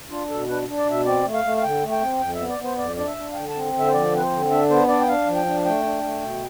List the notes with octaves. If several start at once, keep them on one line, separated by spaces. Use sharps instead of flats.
D4 F4
B2 A4
D4 B4
D4
D5
B2 E5
C4 D5
A3
F5
A3
F5
D3 G5
A3
G5
C4
F2 G5
E5
B3
D5
B3
C5
F2 D5
D4 D5
E5
D4
F5
D3 G5
A5
C4
D3
E5
C5
F3 D5
C4 B4
C5
D3
D4 E5
B3 C5
D4 D5
G5
D4 F5
F3
G5
D4
A3 G5
D4
A3
B2